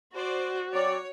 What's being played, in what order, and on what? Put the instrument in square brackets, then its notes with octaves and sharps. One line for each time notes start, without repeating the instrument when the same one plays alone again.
[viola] F#4 [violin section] C5 D5
[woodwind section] F#3 C4 D5 [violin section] C#5